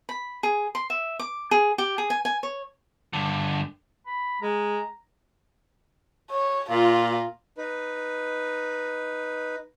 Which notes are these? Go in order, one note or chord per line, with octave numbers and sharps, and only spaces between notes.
B5
G#4
C6
E5
D6
G#4
G4
G#4
G#5
G#5
C#5
G2 D3
B5
G#3 A#5
C#5
A#2 F4
D#4 B4